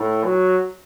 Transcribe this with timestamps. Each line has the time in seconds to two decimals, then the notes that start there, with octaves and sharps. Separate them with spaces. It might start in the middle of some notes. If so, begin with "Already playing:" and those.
Already playing: A2
0.25 F#3